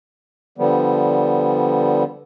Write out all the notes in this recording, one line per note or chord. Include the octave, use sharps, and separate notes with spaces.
D3 F3 G3 B3